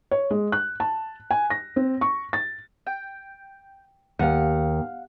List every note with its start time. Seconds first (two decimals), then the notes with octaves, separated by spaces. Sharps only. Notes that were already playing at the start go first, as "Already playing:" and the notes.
0.11 C#5
0.31 G#3
0.52 F#6
0.80 A5
1.31 G#5
1.50 A#6
1.76 C4
2.01 C#6
2.33 A6
2.86 G5
4.19 D#2 F5 F#5